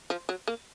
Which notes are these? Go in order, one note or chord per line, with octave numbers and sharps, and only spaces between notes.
F3
F#3
A#3